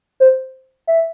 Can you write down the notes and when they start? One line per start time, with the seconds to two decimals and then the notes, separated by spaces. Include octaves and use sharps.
0.20 C5
0.87 E5